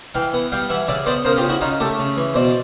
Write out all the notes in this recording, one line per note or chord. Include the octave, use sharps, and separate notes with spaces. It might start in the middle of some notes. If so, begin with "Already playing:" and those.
E3 F5 G5
B3
G3 F5 G5
E3 E5 F#5
C#3 D5 E5
B3 C5 D5
C#3 A#4 C5
F4 G4
C#3
E4 F#4
C#3 D#4 F4
A3 G4 A4
C#3
E3
B2 C5 D5